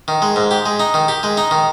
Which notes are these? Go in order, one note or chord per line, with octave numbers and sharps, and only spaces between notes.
D#3
G#3
G#2
G4
G#3
D#4
D#3
G4
G#3
D#4
D#3